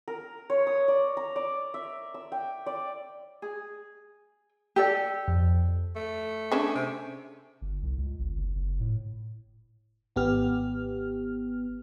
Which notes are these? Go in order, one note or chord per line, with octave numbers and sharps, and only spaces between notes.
A#4
C#5
D#6
D5
A#5
D5
E5
E6
G5
D5
G#4
G4 A4 D5
F2
A3
C#4 D4 G#4
C3
G1
C2
C#2
G1
F#1
F#1
A2
G#1 B3 G4 F6